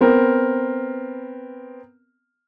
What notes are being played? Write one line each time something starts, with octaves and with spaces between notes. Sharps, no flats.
B3 C4 A#4